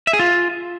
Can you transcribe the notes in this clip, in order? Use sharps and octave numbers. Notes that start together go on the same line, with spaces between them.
E5
G#4
F4